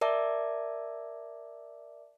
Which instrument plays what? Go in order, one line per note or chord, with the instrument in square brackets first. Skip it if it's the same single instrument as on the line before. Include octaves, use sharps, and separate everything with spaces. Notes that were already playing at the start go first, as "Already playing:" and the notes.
[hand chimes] A#4 D5 E5 A5 D6